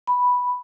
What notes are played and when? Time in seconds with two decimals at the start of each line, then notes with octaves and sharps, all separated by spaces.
0.07 B5